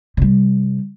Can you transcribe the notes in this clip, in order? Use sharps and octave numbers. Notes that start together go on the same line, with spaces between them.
C3 G3